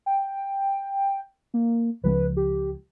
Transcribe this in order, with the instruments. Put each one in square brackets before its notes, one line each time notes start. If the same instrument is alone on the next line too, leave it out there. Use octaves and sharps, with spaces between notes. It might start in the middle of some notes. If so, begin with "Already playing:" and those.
[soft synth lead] G5
A#3
[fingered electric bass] C#2 F3 G#3 [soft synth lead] B4
[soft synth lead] G4